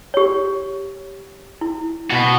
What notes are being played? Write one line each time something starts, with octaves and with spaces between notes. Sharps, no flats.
G4 C#5
E4
B2 F#4